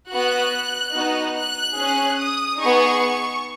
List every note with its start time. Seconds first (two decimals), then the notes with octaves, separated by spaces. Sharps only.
0.10 B3 F#4 F#6
0.94 B3 D#4 F#4
1.36 F#6
1.77 C#4 G#4
2.20 D#6
2.62 B3 D#4 G#4 C#6